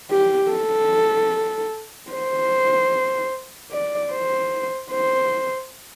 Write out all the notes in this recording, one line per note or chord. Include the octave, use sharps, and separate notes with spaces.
G4
A4
C5
D5
C5
C5